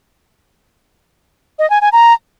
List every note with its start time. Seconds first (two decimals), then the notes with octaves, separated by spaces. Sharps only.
1.59 D#5
1.70 G#5
1.81 G#5
1.92 A#5